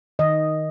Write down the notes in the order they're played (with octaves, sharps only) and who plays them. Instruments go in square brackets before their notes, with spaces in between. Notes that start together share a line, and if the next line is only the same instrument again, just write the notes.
[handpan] D#3 D#5